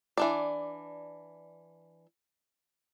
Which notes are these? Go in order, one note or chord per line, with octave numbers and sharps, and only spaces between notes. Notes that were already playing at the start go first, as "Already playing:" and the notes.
E3 D4 D5